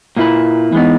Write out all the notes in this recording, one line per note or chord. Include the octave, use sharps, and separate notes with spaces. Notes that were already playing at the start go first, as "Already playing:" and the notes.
A#2 A#3 E4 B4
E3 G#3 B3 D#4